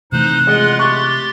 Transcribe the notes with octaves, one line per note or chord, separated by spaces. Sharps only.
C3 E3 A3 D#4 C5 F#6
G#3 F4 F#5 C6
G4 C6 C#6 A6